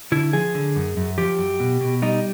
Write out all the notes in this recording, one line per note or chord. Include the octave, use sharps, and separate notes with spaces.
D3 E4
F3 G#4
D3
F#2
F#2
F3 G4
F#2
B2
B2
G3 D#4